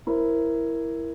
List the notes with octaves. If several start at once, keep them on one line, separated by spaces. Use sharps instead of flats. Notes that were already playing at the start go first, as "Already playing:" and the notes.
E4 A#4 C5